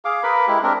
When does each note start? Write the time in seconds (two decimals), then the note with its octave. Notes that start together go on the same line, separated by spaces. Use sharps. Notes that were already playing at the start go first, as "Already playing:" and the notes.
0.05 G#4 F5 D6
0.23 A#4 B4 B5
0.47 G#3 E4 G4
0.63 C4 D4 A#4